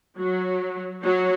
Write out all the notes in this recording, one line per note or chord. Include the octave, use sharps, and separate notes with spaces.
F#3
F#3